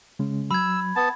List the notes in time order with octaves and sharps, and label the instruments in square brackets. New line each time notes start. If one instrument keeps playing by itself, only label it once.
[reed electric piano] C#3 G#3 C#4
[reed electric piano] F#3 [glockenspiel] B5 G#6 [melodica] E6
[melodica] B3 A5